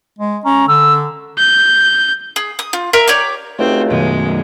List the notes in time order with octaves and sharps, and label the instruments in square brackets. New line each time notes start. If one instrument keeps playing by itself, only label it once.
[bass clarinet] G#3
[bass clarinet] C#4 [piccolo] A#5
[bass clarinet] D3 [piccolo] E6
[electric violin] G6
[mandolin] G#4
D#6
F4
A#4 E5 A#5 C6
G4 C#5 D5 D6
[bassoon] C#2 [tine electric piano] A3 D#4 F#4 [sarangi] C4
[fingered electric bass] F#2 B2 D#3 [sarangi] G#3